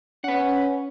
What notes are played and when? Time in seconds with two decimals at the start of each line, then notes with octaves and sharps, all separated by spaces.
0.24 C#4 B4 F#5